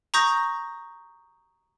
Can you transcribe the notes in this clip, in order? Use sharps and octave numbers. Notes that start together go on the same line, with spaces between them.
A#5 C#6 D#6 G6 A#6